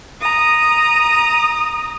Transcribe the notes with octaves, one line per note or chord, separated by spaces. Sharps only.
A#5 D#6